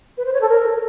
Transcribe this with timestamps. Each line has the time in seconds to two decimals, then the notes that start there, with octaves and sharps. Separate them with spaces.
0.18 B4
0.25 C5
0.33 C#5
0.41 A4
0.49 A#4